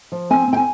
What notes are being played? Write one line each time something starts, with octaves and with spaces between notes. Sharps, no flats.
F3
C4 G#5
C4
G5
G#5